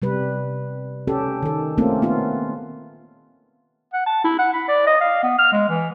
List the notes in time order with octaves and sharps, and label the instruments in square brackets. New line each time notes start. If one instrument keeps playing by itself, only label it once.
[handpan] C3 G3 B4
C#4 G4 A4
D#3 A4
A3 A#3 C4 C#4 F4 A4
B3 F4
[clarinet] F#5
A5
E4
F#5
B5
D5
D#5
F5
B3
F6
G#3
E3